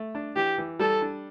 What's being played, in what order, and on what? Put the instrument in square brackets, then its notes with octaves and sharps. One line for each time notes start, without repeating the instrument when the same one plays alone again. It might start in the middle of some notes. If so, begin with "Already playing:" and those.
Already playing: [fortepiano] A3
D4
[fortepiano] E3 [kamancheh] G4
[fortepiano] E3
[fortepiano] G3 [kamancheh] A4
[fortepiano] D4